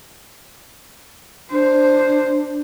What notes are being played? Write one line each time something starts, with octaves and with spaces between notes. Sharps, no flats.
D4 C5